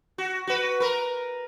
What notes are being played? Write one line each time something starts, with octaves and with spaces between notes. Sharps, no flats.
F#4
F#4 B4
A#4 B4